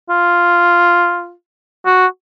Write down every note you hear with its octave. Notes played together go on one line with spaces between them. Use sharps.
F4
F#4